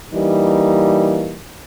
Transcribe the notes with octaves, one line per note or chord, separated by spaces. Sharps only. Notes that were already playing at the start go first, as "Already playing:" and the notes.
E3 G3 A#3 D#4